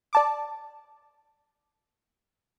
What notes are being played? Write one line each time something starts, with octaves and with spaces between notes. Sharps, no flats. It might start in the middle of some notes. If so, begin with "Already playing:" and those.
D5 A5 D6